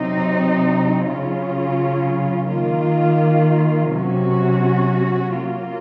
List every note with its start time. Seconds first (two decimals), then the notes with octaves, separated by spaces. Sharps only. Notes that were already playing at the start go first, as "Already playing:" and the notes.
Already playing: C3 F#3 C4 D#4
1.04 C#3 F#3 C#4 F4
2.49 D#3 A#3 F4
3.92 C3 F#3 C#4 F#4
5.36 F#3 A#3 F4